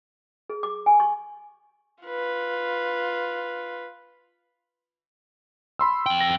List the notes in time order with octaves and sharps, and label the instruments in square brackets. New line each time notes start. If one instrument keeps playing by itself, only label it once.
[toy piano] G#4
D6
G#5
C#6
[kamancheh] F4 B4
[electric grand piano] B5 C6 E6
[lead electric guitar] F2 G5
[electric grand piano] A#6